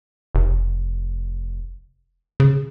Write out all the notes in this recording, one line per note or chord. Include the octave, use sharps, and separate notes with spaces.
F1
C#3